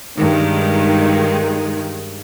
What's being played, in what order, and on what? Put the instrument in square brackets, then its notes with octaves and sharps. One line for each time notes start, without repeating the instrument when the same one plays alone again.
[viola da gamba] G2 [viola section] D#3 G#3